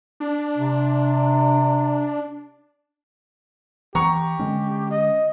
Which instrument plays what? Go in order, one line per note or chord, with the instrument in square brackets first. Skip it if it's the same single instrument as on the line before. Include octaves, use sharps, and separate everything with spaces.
[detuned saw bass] D4
[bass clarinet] C3
[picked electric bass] E3 [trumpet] G4 [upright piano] A#5 C#6
[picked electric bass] D3 G#3 C#4
[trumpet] D#5